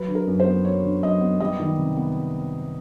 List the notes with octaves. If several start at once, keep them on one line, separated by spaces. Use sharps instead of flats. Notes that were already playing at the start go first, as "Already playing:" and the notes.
Already playing: F#3 B4
D3
A#4
F#2
C5
B3
F#3 C#5
D3
F#2 D#5
B3
G3 D#5
D#3
C3
B3